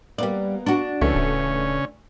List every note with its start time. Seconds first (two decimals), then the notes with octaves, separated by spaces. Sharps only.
0.18 G3 A#3 B3 D5
0.66 D4 F#4
1.01 C#2 C#3 E3 A3 C#4
1.15 D1